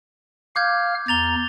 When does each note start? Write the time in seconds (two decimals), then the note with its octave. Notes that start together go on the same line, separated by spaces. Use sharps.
0.56 F5 D6 F6 G6 G#6
1.08 E2 A#5 A6 F7 G7